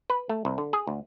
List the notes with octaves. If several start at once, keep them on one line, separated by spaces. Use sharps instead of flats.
B4
A3
C2
D3
G#4
D2